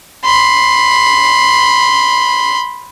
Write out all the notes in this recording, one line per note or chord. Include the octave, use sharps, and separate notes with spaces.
B5 C6